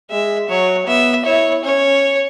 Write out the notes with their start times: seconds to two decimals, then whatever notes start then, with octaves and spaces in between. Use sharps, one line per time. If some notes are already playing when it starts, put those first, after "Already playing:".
0.11 G#3 E5
0.49 F#3 C#5
0.87 B3 E5
1.25 E4 C#5
1.64 C#4 C#5